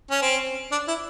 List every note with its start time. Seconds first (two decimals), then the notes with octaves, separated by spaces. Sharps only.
0.11 C#4
0.22 C4
0.72 D4
0.88 E4